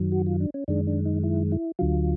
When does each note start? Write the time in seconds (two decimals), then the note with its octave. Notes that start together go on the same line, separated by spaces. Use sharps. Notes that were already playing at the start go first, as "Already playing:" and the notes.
Already playing: F#2 D#3 F#3
0.12 F#4
0.27 F4
0.40 D4
0.54 C#4
0.68 F#2 D#3 G#3 D4
0.87 D4
1.05 D#4
1.24 E4
1.52 E4
1.79 D2 D3 F#3 F4